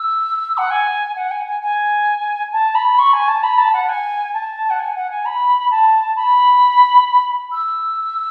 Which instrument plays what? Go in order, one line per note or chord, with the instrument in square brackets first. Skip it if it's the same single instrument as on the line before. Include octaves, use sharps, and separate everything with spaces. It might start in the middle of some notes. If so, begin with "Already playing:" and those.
Already playing: [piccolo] E6
F#5
G#5
F#5
G#5
G#5
G#5
A5
B5
C#6
G#5
A5
B5
A5
F#5
G#5
A5
F#5
G#5
F#5
G#5
B5
A5
B5
E6